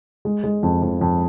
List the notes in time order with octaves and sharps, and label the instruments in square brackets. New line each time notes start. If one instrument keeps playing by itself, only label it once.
[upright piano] G#3
G#3
F2
F2
F2